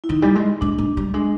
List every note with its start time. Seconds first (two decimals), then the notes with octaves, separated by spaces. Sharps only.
0.04 E4
0.09 D#3 D#4
0.22 G3
0.35 G#3
0.61 G#3 D4
0.78 G#3
0.97 G3
1.14 G#3 D4